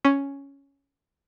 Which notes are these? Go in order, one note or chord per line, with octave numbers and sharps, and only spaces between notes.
C#4